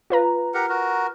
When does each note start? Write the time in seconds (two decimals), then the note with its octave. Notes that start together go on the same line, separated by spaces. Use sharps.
0.10 F4 B4 A#5
0.54 G4 A#4 F#5
0.69 F#4 A#4